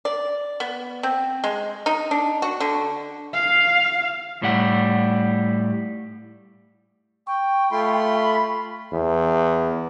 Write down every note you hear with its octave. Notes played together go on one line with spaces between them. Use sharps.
D5
B3
C4
G#3
D#4
D4
F#4
D3
F5
A2 G3 F#5
G5 C#6
A3 F4 B5 C6
E2